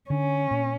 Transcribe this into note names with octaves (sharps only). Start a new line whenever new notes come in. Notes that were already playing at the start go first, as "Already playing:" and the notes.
D3 C#4
A#2